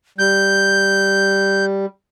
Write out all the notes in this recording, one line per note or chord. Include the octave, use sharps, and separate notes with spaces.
G3 G6